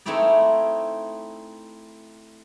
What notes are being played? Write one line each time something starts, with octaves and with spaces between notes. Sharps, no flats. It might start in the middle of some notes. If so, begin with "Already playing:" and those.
A3 C4 D#4 E4 C#5 D5